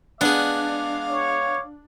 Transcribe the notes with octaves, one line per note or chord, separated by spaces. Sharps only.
G#3 B3 D4 G#4 F5 D6
C#5